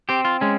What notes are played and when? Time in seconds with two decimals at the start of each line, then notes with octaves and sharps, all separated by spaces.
0.09 C4 G4
0.25 F4
0.41 G#3 C#4